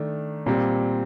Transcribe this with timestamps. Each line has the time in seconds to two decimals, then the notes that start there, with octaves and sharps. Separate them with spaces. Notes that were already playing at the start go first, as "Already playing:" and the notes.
Already playing: D#3 A3 D4
0.46 A#2 G3 C4